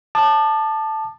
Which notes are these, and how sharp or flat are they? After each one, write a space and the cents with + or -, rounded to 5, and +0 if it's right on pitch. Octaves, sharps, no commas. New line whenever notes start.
A5 +0 D6 +45